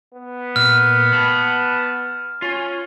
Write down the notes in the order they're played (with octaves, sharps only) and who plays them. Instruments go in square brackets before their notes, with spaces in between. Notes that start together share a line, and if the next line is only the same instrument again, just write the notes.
[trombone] B3
[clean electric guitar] A#2 [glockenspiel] F6
[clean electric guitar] A5 B5
[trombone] C#4 [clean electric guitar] F4